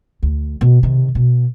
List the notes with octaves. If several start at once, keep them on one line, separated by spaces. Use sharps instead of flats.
D2
B2
C3 D#3
B2